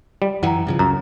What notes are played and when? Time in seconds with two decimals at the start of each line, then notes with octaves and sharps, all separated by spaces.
0.22 G3
0.43 F#2 E3 F#5 G5 A#5
0.67 G2 C#3 F3
0.79 C#2 F#2 A#5